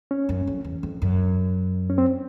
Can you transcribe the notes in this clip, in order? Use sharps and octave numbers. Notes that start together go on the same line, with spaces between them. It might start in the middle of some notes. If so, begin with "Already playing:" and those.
C#4
F#2
F2
E2
F2
F#2
C#4
C4